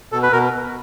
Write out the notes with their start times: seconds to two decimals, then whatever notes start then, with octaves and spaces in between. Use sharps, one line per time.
0.12 B2 A4
0.23 B4
0.32 B2 A#4